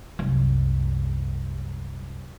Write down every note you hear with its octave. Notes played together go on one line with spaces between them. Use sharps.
C2 F#2